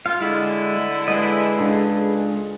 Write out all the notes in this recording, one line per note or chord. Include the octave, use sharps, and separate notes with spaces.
F4 F5
D3 G#3 E4
G#3 G#4 B4 D#5
C#2 D4 A4